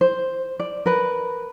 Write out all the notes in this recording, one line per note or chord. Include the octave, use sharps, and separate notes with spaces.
C5
D5
A#4 B4